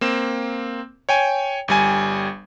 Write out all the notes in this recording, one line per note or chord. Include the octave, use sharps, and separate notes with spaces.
A#3 C4 E7
C#5 G5 G#5
G1 G3 G#5